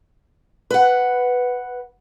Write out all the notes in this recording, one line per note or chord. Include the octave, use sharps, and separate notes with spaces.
B4 F#5